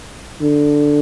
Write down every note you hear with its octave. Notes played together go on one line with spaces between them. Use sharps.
D3